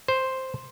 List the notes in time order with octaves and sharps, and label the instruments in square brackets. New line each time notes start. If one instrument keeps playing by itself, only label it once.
[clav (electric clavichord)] C5